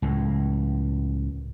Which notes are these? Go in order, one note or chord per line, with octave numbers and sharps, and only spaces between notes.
C#2 A2